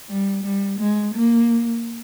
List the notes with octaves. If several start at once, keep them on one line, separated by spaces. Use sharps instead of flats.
G3
G3
G#3
A#3